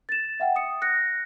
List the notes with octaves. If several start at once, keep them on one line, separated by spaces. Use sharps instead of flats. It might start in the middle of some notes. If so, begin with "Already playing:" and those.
A6 E7
E5 F#5 G5
D#6 C#7
F#6 A#6 C#7